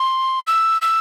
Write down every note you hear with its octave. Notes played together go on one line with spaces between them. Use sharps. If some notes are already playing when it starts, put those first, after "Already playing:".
Already playing: C6
E6
E6